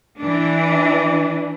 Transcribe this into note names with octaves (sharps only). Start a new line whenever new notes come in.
E3 D4